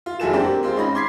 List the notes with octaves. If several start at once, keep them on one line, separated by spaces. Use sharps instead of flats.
F4
F#1 E4 F#4 G#4 A4 E7
C4 D4 G4 A#4
G#3 C4 F4
C#4 D#4 B5 A#6
C6 D6 G#6 B6 C7